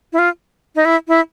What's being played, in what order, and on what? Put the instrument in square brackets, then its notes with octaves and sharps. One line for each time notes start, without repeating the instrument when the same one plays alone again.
[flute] E4
F4
D#4
E4
E4